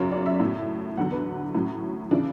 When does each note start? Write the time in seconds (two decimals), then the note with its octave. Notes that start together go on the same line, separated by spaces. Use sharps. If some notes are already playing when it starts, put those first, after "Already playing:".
Already playing: F#2 C#3 F#3 C#5
0.11 D5
0.26 E5
0.40 A2 F#3
0.97 E2 D3 F#3 F#5
1.12 B4
1.54 A2 F#3 C#4
2.11 C#3 E3 D4